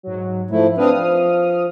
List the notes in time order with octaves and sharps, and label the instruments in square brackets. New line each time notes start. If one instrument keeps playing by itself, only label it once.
[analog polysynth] G#2 F#3
[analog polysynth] G#2 [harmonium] F3 A3 E4
[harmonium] C4 D4 B4 [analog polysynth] F5 D#6 F6
[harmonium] F3